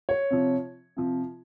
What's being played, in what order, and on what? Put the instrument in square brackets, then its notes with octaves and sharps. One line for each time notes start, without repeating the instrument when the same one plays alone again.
[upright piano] C#5
C3 F3
C3 F3